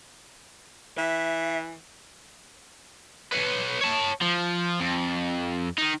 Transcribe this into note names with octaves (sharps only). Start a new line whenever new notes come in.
E3 E5
B4 C#5
C#5 A5
F3
F2
D#3 D#4